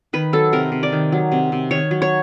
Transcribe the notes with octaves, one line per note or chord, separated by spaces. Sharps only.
D#3 B4
F#3 A4
C3 A#4
C3
D5
D#3
F#3
C3
C3
D#3 C#5
F#3
C#5